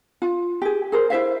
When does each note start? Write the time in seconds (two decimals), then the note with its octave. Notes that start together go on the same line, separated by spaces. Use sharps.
0.22 F4
0.62 G4 G#4
0.92 G#4 A#4 C5
1.10 E4 C5 E5 F5